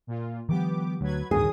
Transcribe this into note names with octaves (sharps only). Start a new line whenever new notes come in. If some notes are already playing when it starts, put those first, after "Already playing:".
A#2 F4
D#3 F3 G3 B3 G4 D6
D2 F#3 B4 G#6
D1 G2 D#3 F#3 G#4 D#6